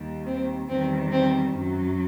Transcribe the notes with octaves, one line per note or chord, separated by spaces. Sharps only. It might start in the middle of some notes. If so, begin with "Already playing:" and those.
Already playing: D#2 D#3 G3
C4
E2 D#3 G3 C4
C4
F#2
F#3